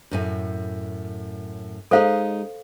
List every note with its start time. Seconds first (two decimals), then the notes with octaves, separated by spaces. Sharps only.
0.11 F#2 A2 G#5
1.91 G#3 D#4 G#4 A4 C5 F5